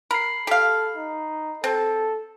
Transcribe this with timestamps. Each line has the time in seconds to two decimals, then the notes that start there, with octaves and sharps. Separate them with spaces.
0.11 A#4 B5 C7
0.47 G4 A4 F5
0.96 D#4
1.64 C4 A4